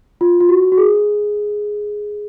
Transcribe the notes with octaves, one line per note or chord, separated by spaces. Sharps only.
F4
F4
F#4
F#4
G#4